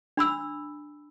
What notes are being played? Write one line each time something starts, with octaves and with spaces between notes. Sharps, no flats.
D4 B5 E6